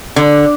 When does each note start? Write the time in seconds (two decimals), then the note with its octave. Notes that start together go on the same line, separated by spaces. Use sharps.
0.16 D3